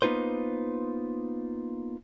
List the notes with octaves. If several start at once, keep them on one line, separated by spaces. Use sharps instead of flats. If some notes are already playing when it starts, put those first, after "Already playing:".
A#3 B3 D#4 F4 B4 C5